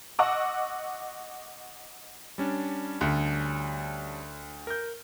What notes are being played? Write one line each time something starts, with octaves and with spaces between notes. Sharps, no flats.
D#5 F#5 C#6 D6 E6
G3 C#4 D4
D2
A#4 G6